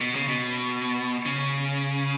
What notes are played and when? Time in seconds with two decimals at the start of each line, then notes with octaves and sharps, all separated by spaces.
0.01 B2
0.15 C#3
0.28 B2
1.26 C#3